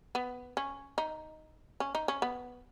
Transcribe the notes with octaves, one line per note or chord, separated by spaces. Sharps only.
B3
C#4
D#4
C#4
D#4
C#4
B3